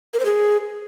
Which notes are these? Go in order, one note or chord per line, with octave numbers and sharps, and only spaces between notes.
A#4
C5
G#4